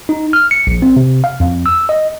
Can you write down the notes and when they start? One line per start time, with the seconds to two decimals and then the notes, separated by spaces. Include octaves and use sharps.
0.09 D#4
0.33 F6
0.51 C#7
0.67 A#1
0.82 C4
0.96 C3
1.24 F5
1.40 F2
1.66 E6
1.89 D#5